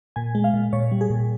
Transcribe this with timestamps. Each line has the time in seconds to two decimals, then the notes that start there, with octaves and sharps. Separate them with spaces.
0.16 A#2 G#5
0.35 G#3
0.44 F5
0.54 A#2
0.73 A#2 C#5
0.91 G3
1.01 G#4
1.10 A#2